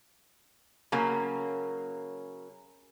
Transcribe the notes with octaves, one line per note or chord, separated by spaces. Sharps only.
C#3 F#3 A#3 C#4